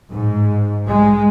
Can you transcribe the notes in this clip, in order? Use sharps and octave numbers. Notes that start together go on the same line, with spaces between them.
G#2
G#3